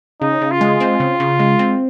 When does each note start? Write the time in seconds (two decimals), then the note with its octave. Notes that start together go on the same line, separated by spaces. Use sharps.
0.21 C#3 D#4
0.41 C#3
0.51 F4
0.61 G#3
0.80 C4
1.00 C#3
1.20 C#3
1.39 G#3
1.59 C4